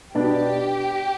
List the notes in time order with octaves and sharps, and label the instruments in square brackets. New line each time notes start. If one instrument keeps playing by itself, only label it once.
[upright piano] B2 B3 D4 [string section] G4